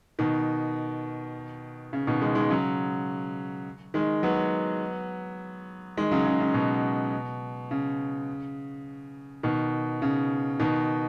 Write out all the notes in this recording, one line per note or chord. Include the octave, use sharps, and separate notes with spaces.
B2 D#3
C#3
B2 D#3
D#3 G#3
D#3 G#3
C#3 F#3
D#3 G#3
F#3 B3
D#3 G#3
C#3 F#3
C#3
C#3
B2
C#3
B2 D#3
C#3
B2 D#3